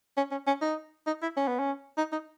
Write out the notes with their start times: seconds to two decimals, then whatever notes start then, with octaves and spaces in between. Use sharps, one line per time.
0.17 C#4
0.32 C#4
0.47 C#4
0.61 D#4
1.07 D#4
1.22 E4
1.37 C#4
1.48 B3
1.59 C#4
1.98 D#4
2.12 D#4